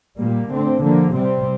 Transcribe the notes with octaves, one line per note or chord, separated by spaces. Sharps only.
A#2 G3 A#3
D3 A3 C4
D3 F3 A#3
C3 G3 C4